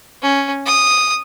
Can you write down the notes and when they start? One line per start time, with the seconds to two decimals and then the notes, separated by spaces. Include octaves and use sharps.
0.22 C#4
0.66 D#6